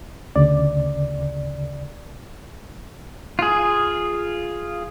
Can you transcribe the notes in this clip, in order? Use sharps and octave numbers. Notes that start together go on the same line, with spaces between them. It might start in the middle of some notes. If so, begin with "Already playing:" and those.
D2 C#3 D5
F4 G#4